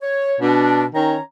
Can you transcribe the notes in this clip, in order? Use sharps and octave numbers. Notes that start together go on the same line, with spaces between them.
C#5
B2 D4
D#3 C#4 C#5 A#5